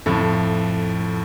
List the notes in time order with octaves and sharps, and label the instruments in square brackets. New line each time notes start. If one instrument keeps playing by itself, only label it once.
[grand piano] F2 A2